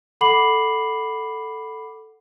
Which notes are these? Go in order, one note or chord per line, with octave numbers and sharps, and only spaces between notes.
A4 F#5 B5 D6 C7 F#7